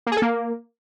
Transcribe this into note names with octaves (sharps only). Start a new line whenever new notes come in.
A#3
G#4
A4
A#3